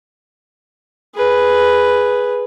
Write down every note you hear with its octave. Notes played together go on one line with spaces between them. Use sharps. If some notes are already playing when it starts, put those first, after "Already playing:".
G#4 B4